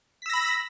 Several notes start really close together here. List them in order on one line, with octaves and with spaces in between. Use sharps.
B6 E6 A#6 B5